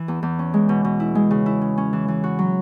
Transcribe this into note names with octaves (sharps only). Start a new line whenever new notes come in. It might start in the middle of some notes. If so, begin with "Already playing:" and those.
Already playing: E3
E2
E2
C#4
G#3
B2
B2
E4
G#3
C#3
E4
C#4
C#4
E3
E3
F#4
F#3